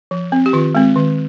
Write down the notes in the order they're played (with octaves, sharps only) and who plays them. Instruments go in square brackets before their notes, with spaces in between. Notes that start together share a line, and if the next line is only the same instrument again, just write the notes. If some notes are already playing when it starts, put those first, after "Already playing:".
[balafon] F3
C4
G4
D#3 F4
G#3 C4
D#3